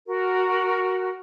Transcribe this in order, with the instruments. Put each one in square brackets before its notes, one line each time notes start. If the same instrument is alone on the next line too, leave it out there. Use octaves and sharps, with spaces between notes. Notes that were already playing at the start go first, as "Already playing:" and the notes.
[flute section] F#4 A#4